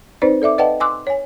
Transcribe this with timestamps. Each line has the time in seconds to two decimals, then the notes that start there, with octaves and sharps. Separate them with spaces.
0.22 C4 D#4 B4 C5 D5
0.42 A4 D5 E5 D6
0.58 B4 D5 D#5 F#5 G5 A5
0.80 G#5 C6 D6 E6 F#6
1.07 C#5 G#5